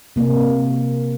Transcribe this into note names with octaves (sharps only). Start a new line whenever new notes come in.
C3 A#3